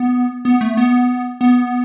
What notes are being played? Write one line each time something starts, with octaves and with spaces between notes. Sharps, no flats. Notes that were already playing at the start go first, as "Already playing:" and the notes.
Already playing: B3
B3
A3
B3
B3